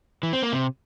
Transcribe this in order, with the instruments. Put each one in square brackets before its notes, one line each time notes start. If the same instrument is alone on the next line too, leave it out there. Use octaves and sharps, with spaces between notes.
[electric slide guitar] E3
C4
A#3
C3